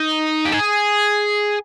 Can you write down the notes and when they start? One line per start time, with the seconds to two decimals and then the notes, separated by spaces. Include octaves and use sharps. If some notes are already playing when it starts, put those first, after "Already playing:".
Already playing: D#4
0.46 G4
0.52 G#4